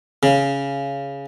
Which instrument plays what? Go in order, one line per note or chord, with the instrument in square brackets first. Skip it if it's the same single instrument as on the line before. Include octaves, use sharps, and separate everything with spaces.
[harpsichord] C#3